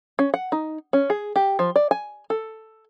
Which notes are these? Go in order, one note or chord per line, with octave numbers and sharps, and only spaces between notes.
C#4
F#5
D#4
C#4
G#4
G4
F3
D5
G#5
A4